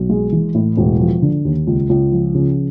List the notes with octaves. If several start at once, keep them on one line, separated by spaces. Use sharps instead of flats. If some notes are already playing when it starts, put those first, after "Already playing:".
Already playing: B1
G#3
E3
A2
E1
F3
D3
D#2
C#2
C#2
F3
C#3